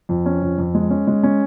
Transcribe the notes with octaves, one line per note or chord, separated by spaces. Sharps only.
F2
C#4
F2
F2
G#3
C#4
G#3
C#4